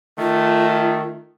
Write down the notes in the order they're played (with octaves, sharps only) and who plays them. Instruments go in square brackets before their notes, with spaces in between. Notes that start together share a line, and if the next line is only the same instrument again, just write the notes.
[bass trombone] D#3 [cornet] A3 [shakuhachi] F4